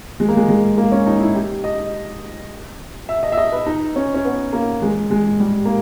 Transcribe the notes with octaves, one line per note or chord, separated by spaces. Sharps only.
G#3
A#3
G#3
G#3
A#3
C#4
D#4
E4
G4
D#5
E5
D#5
E5
D#5
B4
D#4
C#4
C#4
B3
A#3
G#3
G#3
G3
A#3